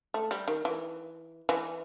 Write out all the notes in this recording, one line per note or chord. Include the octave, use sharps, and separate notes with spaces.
A3
G3
D#3
E3
E3